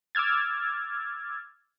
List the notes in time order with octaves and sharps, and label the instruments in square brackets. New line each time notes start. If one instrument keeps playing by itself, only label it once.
[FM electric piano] D6 E6 F6 G#6 A6